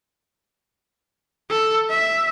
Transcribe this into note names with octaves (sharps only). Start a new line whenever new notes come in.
A4
E5